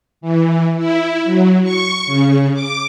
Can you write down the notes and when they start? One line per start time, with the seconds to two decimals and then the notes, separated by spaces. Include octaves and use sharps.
0.21 E3
0.76 E4
1.24 F#3
1.63 C#6
2.06 C#3
2.54 D6